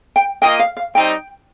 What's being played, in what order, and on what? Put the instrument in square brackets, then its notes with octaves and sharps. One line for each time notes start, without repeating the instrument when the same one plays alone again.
[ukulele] G5
[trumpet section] A#3 F4 D#5 [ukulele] G5
[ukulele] F5
F5
[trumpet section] G3 C4 D#4 C5 [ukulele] G5